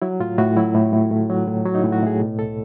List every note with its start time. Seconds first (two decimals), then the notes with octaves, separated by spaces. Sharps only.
0.02 F#3 E4
0.20 A2 F4
0.38 A2 F#4
0.57 F#3 E4
0.75 A2
0.93 A2
1.11 A2
1.29 F#3
1.48 A2
1.65 F#3
1.75 D#4
1.80 E4
1.84 A2
1.92 F#4
2.02 A2 G#4
2.20 B2
2.38 C2 A4